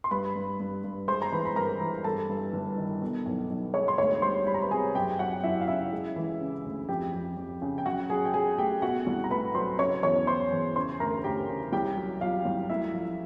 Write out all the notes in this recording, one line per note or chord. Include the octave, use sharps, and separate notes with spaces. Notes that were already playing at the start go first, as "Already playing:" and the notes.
C6
G2 B4 B5
G2
G2
G2
G#3 C5 C6
A#5
E3 B4 B5
B5
G2 A#4 A#5
E3
G2 A4 A5
G2
G1
D#3
B2
B1
B1
G#3 C#5 C#6
C6
D2 C#5 C#6
G3 C5 C6
G3 B5
A#5
B4 B5
C3 G#4 G#5
F#2 G4 G5
F#3 F#4 F#5
F#2 E4 E5
F5
C#3 E4 E5
G#3
E3
C#3
D2
F2 G4 G5
F2
F2
C#3
G5
F#3 F#4 F#5
F#3 G#4 G#5
G5
F#3 G#4 G#5
A3 G4 G5
B2 F#4 F#5
C2
A#5
A3 B4 B5
F#3 C5 C6
C#3 C#5 C#6
E2 C#5 C#6
E2 C5 C6
E2
C#3 C5 C6
D2 A#4 A#5
D2 G4 G5
C#3
C2 G4 G5
F#3
F#3 F4 F5
C2
A3 E4 E5
F3